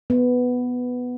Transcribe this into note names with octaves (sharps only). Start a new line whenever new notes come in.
B3